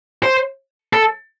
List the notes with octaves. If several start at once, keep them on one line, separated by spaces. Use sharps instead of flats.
C5
A4